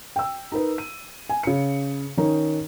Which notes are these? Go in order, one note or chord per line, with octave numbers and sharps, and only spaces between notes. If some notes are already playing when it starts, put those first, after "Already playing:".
G5 E6
D#4 A#4 B4
D#7
G#5
C#3 C#7
D#3 C#4 D#4 A#4